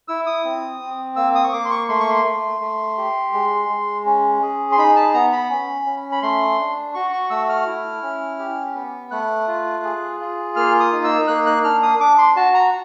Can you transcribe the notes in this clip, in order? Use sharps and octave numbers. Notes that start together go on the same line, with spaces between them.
E4 E6
D#6
C4
C4
A#3 E6
D#6
C#6
A#3 D6
C6
C#6
A3 C6
C#6
C6
A3
A3
G4
G#3
G#3
C#4
G#4
C6
D#4 B5
A5
B3 A#5
B5
C#4
C#4
B5
A3 C6
D4
F#4 C#6
C#6
A3 E6
F6
E4
C#4
G4
B3
A3 F#6
F4
G#4
F4
A#3 F6
D#6
D#4
E6
A#3 F#6
F#6
D4 F6
D#6
D4 D6
C6
F#4 A5
A#5